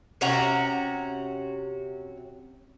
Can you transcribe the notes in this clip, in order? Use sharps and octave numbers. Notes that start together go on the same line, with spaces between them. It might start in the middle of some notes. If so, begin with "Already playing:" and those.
C3 C#4 F#4 A#5